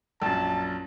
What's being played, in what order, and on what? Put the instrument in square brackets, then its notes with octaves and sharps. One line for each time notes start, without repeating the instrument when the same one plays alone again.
[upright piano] A#1 F#2 [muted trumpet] A5